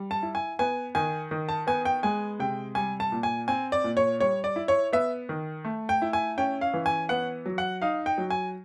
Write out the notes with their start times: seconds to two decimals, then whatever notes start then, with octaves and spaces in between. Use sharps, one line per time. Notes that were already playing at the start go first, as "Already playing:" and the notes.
Already playing: G3
0.11 A5
0.23 E4
0.35 G#5
0.59 B3 G#5
0.95 D#3 G#5
1.31 D#3
1.49 A5
1.67 B3 G#5
1.85 G5
2.03 G#3 G#5
2.39 C3 G5
2.75 G3 G#5
3.00 A5
3.12 A#2
3.23 G#5
3.48 C4 G#5
3.72 D5
3.84 A#2
3.97 C#5
4.20 G3 C#5
4.44 D5
4.56 E4
4.68 C#5
4.93 B3 E5
5.29 D#3
5.65 A3
5.89 G5
6.02 E4
6.13 G#5
6.38 C#4 G5
6.61 F5
6.74 E3
6.86 G#5
7.09 B3 F#5
7.46 F#3
7.58 F#5
7.82 D#4 F5
8.06 G5
8.18 F#3
8.30 G#5